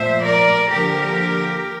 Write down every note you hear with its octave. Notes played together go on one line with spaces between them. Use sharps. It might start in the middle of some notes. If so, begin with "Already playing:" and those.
Already playing: A#2 F3 A3 C5 E5
A#4 D5
D3 F3 A#3 G4 A#4